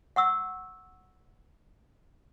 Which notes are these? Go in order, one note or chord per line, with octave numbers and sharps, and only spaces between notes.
F#5 C#6 E6